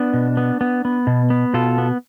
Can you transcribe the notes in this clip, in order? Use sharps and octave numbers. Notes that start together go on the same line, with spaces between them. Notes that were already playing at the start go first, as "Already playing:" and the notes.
Already playing: B3 D4
B2
B3
B3
B3
B2
B3
B2 F4 A4
B3